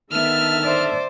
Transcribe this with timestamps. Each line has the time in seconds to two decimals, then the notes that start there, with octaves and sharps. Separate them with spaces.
0.12 D3 D#3 B3 E5 A5 F6
0.62 C5 D5